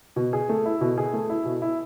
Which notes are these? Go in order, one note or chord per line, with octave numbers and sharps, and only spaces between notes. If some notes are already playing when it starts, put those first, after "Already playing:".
B2
G#4
A3
E4
B2
G#4
A3
E4
B2
E4